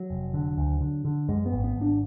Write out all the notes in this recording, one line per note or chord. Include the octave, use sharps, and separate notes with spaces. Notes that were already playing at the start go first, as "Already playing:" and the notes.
Already playing: F#3
F1
D3
D2
D3
D3
F#2 G#3
B3
G#1
B3
G#1
D4